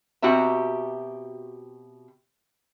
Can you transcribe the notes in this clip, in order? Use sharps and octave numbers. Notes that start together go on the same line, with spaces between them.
B2 C4 F#4 G4 E5 A#5